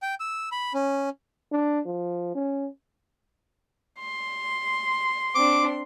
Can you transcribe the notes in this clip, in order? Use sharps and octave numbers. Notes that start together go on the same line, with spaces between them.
G5
E6
B5
C#4
D4
F3
C#4
C6
C4 D4 D6